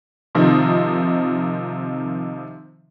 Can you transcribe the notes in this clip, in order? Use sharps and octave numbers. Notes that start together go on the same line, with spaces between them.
C3 D#3 F3 D#4